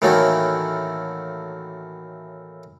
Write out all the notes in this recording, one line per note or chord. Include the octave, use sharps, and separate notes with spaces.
A2 D#3 E3 F#3 A3 A#3